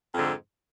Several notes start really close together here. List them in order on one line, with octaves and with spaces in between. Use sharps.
F2 G#2 D3